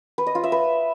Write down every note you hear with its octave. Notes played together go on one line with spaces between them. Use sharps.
B4
D#5
F4
E5
B4